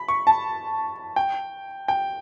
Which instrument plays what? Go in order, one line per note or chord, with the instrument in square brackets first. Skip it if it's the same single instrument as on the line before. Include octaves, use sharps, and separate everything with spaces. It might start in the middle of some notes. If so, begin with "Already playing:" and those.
Already playing: [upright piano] B5
C#6
A5
G5
G5